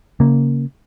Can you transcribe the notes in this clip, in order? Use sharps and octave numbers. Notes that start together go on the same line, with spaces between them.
C#3 A#3